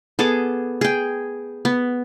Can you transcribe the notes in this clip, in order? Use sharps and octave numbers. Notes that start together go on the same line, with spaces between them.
B3 G#4 A4 D6
G#4 G5
B3